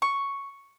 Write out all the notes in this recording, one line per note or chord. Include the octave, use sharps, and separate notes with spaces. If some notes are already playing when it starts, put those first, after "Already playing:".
C#6